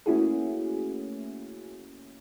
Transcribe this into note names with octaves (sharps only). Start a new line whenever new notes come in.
A3 A#3 C#4 E4 F#4 G#4